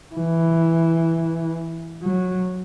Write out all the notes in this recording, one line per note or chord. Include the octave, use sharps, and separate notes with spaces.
E3
F#3